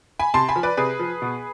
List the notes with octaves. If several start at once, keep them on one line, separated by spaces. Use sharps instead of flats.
G#5 B5
C3 A5 C6
G#5 B5
F3
B4 D5
C3 G#4 B4
F3
B2